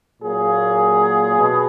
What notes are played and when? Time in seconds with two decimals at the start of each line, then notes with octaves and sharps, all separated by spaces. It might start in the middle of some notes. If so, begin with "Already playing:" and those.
0.21 A#2 F#3 A#3 G#4
1.39 B2